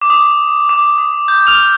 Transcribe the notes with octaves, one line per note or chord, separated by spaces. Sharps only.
D6
D#6
D6
D#6
G6
F6 F7